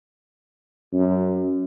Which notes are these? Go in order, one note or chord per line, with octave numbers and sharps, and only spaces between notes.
F#2